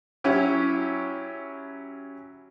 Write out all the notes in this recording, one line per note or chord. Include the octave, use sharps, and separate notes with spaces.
F#3 C#4 E4 G4